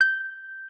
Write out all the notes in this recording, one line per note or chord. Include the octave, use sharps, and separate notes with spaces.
G6